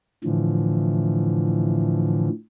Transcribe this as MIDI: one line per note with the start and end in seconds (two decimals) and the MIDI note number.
0.24 2.29 45
0.24 2.29 50
0.24 2.29 52
0.24 2.29 53